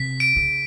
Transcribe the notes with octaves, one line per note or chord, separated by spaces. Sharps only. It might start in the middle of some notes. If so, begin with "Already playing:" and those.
Already playing: C3 B6
D7
C#3